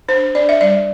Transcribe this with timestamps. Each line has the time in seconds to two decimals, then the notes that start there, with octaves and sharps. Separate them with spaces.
0.08 D4 C5
0.34 D4 D5
0.49 E5
0.61 G3 D5